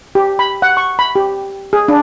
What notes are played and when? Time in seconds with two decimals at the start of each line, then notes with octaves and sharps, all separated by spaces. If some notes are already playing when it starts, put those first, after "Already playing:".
0.15 G4
0.39 B5
0.62 F#5
0.77 C#6
0.99 B5
1.16 G4
1.73 G#4
1.88 D4